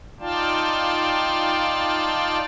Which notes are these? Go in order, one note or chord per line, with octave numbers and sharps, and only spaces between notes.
D#4 F4 D5 F5 G5 A5